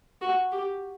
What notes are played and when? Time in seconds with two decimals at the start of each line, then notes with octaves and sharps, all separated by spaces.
0.22 F#4
0.52 G4